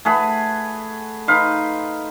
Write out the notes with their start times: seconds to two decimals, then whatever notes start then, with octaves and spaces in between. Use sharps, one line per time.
0.05 A3 G#4 B4 F#5
1.27 D#4 B4 F5 C6